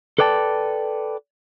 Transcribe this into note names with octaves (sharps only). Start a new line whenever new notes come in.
A4 B4 D5 G5 A5